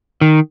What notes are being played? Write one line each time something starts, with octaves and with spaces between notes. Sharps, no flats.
D#3